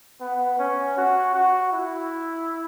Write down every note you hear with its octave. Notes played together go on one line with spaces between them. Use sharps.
B3
C#4
F#4
F#4
E4